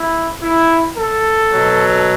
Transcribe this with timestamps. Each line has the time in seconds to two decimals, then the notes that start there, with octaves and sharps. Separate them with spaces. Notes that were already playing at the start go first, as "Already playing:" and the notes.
Already playing: E4
0.43 E4
0.98 A4
1.53 B2 F#3